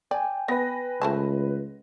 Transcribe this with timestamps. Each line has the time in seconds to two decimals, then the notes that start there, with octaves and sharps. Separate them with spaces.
0.11 D5 G5 G#5
0.48 B3 B4 A#6
1.02 C#2 A3 C5 A5